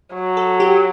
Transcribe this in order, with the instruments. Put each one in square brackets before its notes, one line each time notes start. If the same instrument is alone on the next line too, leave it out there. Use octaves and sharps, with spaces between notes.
[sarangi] F#3
[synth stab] A4
G4